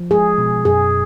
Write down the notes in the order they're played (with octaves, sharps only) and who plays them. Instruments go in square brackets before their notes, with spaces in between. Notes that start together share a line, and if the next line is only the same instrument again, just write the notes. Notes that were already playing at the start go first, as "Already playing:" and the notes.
Already playing: [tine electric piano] F3
[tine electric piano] G#3 [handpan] G#4
[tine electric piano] B2
[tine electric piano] F#2 [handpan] G#4